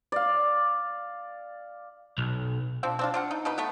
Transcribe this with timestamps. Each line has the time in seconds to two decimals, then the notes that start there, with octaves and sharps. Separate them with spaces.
0.12 D5 F5
2.18 B1
2.83 F3 C4 D4
2.99 C4 D4 F4
3.14 D4 F4 F#5
3.31 D#4
3.45 B2 D#4 B4
3.58 A3 B3 B4